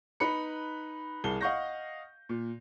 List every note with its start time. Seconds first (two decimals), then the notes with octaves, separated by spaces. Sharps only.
0.20 D#4 B4 B5 C#7
1.24 C2 G#4 A#4 A5 G7
1.41 D#5 F5 F#5 C#6 G6 A#6
2.29 A#2